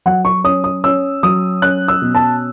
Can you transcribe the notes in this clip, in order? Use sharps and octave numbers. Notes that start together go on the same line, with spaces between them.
F#3 F#5
C#6
C#4 D#6
D#6
C#4 E6
F#3 D#6
C#4 F#6
E6
B2
A5